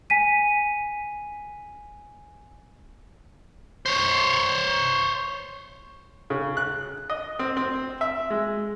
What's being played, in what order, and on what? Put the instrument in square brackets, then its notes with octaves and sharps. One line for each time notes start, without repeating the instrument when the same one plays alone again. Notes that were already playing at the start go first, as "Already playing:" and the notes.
[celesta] G#5 B6 D#7
[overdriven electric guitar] C5 C#5
[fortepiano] C#3
F#6
D#5
C4
C4
E5
G#3